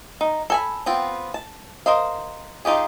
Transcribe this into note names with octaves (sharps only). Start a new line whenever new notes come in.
D#4
A4 G#5 B5
B3 C4 F4 G5
A5
A#4 C5 D#5 F5
D#4 F4 G4 G#4